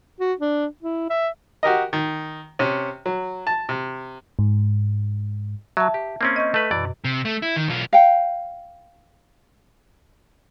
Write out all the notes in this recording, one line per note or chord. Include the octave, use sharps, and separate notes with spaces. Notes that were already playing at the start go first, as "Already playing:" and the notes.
F#4
D4
E4
E5
F#4 G4 A#4 D#5
D#3
C3 C#4
F#3
A5
C3
G#2
F#3 E5 A5
G4
A#3 C4 C#4
D#5 C#6 G6
A3 B4
F#2 B2 E3 D5
C3
A3
E4
D#3
B1 F4
F5 G5